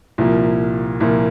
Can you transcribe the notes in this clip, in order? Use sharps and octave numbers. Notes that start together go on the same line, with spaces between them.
C2 A#2 F3 A#3
C2 A#2 F3 A#3